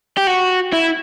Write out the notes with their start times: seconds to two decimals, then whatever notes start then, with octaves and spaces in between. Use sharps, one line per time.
0.17 G4
0.27 F#4
0.73 E4